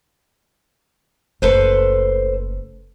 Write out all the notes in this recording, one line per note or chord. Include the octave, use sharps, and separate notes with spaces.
F#1 A3 A4 B4 C5